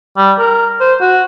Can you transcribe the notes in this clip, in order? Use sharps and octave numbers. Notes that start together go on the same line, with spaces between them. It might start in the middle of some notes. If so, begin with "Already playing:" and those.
G3
A#4
C5
F#4